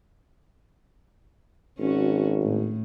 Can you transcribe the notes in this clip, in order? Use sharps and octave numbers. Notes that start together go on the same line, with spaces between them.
G#1 C#4 F#4
A2